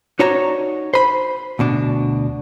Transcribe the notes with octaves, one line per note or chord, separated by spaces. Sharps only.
D#4 F#4 C#5 D5 A5 A#5
C5 B5
D2 B2 D4